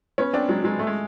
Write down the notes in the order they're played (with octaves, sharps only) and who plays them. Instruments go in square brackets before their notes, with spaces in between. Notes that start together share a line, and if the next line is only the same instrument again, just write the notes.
[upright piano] B3 C#4
C4 D4
F#3 G#3
F#3 G#3
A3
G#3